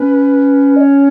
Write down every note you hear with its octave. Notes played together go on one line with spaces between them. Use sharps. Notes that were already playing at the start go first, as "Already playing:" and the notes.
Already playing: C#4 B4
D#5
C#5